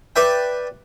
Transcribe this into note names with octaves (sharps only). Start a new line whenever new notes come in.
B4 D5 E5 G5